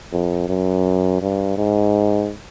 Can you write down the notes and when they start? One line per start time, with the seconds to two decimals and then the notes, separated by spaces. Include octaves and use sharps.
0.13 F2
0.49 F#2
1.21 G2
1.57 G#2